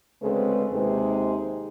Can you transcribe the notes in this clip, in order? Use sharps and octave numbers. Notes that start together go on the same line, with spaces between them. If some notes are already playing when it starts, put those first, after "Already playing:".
D2 C#3 G#3 C4 A4 B4
D#2 C3 G#3 D#4 C5